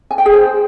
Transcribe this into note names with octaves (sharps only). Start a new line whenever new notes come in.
G#5
G5
G#4
C5